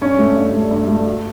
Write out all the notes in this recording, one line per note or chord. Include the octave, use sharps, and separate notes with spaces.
G2 C#4
A3
G2
A3
G2
A3
F#4